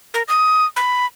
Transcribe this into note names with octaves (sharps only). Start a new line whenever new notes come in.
A#4
D#6
B5